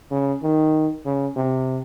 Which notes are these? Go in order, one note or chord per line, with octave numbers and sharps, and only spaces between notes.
C#3
D#3
C#3
C3